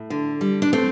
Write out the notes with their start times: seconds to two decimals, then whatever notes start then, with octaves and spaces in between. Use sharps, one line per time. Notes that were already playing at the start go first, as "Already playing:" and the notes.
Already playing: A2
0.10 D3
0.41 G3
0.62 D4
0.73 A3 C4